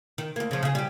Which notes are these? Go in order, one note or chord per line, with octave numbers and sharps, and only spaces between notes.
D#3
D2 A#3
C#3 F3
C#3 G#4
G3 G4